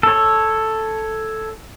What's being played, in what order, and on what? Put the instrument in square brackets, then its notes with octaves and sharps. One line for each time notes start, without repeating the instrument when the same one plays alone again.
[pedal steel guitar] A4 C#5